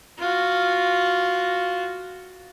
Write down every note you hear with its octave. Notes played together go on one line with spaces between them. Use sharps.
F4 F#4